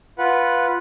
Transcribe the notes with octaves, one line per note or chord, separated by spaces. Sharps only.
F4 B4 F#5